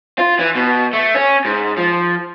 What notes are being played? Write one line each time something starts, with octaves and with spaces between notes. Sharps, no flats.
F4
E3
B2
A3
C#4
G#2
F3